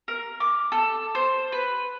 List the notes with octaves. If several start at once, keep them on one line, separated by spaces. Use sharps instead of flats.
A#4
D6
A4
C5
B4